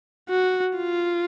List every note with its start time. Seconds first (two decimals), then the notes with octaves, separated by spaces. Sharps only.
0.30 F#4
0.78 F4